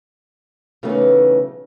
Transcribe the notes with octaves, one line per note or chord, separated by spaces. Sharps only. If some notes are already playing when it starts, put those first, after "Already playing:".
C#3 E3 F#3 A3 B3 D#4